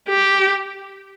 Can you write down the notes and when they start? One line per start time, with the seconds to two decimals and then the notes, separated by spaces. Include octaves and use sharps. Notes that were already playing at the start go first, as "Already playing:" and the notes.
0.09 G4